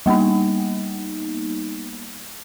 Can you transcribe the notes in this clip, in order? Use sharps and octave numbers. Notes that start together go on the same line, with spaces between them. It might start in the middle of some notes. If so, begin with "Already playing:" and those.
G3 A#3 B3 D#4